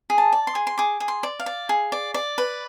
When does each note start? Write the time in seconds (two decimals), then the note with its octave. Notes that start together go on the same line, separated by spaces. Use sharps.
0.10 G#4
0.18 A5
0.32 D5
0.47 C6
0.55 G#4
0.67 C6
0.78 G#4 D6
1.00 G#4
1.08 C6
1.23 D5
1.40 F5
1.46 D5
1.69 G#4
1.92 D5
2.14 D5
2.38 B4